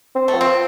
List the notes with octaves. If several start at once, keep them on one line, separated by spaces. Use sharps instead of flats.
C4
A3
F3
C4